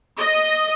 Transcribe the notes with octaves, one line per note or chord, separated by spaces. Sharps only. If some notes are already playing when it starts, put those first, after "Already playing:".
D#5